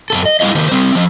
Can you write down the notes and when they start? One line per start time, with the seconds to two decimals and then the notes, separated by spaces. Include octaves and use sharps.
0.10 F#2 A#2 A4
0.25 D#5
0.40 G3 E4 F4 D#5
0.55 D#3 A#3 C5
0.72 G3 C4
0.95 F3 D#5